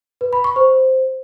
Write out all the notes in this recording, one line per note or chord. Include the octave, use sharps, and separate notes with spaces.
B4
B5
C#6
C5